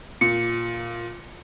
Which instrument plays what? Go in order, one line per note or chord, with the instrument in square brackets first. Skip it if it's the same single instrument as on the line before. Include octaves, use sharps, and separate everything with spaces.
[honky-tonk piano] A#2 [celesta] C#7